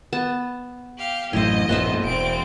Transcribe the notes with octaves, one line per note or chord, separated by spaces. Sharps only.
B3 A5
G4 F5
A1 F#2 A2 E4 C5 D#5
A#1 G2 A#3 B3 C5 E5
E1 C4 D7